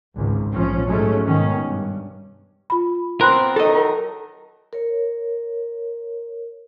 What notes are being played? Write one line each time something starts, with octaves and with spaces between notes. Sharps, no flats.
G#1 C#2
A#1 F3 C#4
G#2 F#3 G#3 A3 C#4
G#2 B2 D#3 C#4
G2
F4 B5
B3 C4 A#4 B5 C6 F#6
D#3 E3 F#3 A4 D#5
A#4 C#5